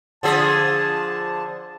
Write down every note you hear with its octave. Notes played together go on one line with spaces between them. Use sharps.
D3 F3 G#4 A5